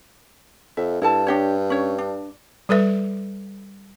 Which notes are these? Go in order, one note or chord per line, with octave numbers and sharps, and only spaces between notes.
F2 E5
G2 E4 A4 A5
D4 G4 C#5
C#4 C#5
D4
G3 A4 B4 E5